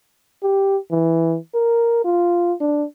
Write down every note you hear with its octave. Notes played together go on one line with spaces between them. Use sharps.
G4
E3
A#4
F4
D4